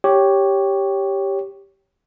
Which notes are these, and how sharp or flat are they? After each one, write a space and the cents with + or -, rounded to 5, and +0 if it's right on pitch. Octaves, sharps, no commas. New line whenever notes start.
G4 +0 C#5 +0